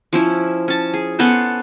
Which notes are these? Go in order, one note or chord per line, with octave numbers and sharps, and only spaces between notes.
F3 C#4 E4
C#4 A5
G#4
B3 C#4 A4 C5